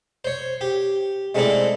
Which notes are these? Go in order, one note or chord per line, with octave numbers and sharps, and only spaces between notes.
C5 C#5
G4
G#3 A3 C4 D4 E4 A4